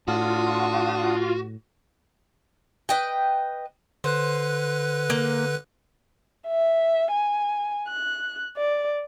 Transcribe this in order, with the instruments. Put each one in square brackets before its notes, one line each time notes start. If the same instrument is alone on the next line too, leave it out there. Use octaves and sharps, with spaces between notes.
[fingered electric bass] A2 [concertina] D4 D#6 [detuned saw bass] F4 [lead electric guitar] F#4
[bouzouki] B4 D#5 G5
[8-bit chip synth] D3 B4 F#6 [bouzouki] C5
[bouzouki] A#3
[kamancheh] E5
G#5
F#6
D5